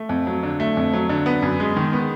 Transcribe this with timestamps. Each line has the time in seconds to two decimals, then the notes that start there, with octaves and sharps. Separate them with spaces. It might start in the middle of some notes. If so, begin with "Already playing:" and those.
Already playing: A3
0.09 F2
0.27 F#3
0.43 D3
0.60 A3
0.77 F2
0.93 F#3
1.09 D3
1.26 B3
1.42 F#2
1.60 G#3
1.76 D#3
1.93 B3